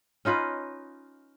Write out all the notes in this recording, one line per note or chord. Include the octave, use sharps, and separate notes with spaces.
C#4 D#4 F4 B4